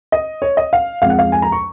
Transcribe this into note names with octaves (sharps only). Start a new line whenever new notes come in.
D#5
C#5
D#5
F5
F2 F3 G#3 F5
F#5
F5
G#5
A#5
C#6